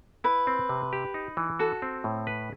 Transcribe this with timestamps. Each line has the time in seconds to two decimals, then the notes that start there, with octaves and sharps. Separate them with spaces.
0.24 E4 B4
0.47 C4
0.69 C3
0.93 G4
1.14 D#4
1.37 E3
1.59 F#4 A4
1.82 C4
2.04 A2
2.27 B4